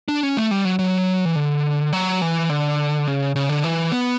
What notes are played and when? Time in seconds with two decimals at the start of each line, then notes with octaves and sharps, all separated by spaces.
0.08 D4
0.23 C#4
0.37 A3
0.51 G3
0.65 F#3
0.79 F#3
1.25 E3
1.36 D3
1.93 F#3
2.22 E3
2.49 D3
3.07 C#3
3.36 C#3
3.49 D3
3.64 E3
3.92 B3